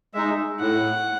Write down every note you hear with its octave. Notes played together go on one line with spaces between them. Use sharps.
G#3 D#4 E5
A2 F#5